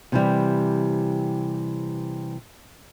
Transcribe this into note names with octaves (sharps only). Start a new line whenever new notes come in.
C3 E3 G3